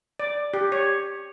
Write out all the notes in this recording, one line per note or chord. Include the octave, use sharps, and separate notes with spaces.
D5
G4
C#5